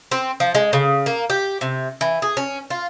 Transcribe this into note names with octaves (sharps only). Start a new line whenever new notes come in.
C4
F3
G#3
C#3
A#3
G4
C3
E3
G#4
C#4
F4